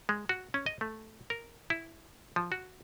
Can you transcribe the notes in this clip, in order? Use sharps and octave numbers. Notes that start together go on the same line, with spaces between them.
G#3
F#4
C#4
D#5
A3
A#4
E4
F3
F#4